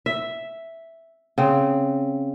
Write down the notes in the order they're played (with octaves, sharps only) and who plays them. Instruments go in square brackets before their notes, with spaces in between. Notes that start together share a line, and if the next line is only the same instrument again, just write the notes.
[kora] E5
C#3 C4